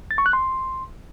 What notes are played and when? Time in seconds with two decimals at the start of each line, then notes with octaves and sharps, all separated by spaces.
0.11 A6
0.18 C#6
0.26 F#6
0.33 C6